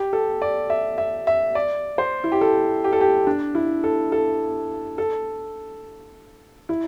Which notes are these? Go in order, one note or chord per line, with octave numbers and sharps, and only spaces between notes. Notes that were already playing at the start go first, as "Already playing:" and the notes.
Already playing: G4
A4
D5
E5
E5
E5
D5
C5
E4
G4
A4
G4
A4
G4
D4
E4
A4
A4
A4
E4